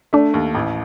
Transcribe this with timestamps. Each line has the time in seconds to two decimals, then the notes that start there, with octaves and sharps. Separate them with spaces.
0.13 A3 D4
0.34 D#2
0.55 A1